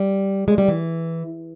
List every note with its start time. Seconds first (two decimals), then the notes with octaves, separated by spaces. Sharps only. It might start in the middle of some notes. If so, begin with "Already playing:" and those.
Already playing: G3
0.48 G#3
0.58 G3
0.68 E3